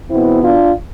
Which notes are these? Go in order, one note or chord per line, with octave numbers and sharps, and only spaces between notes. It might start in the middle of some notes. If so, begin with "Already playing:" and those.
E2 B2 B3 C4 E4
D4 F4